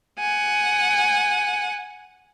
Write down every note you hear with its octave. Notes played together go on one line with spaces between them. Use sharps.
F#5 G#5